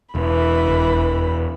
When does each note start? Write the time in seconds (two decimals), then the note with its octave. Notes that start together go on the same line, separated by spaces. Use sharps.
0.15 E1 E3 B5
0.68 F1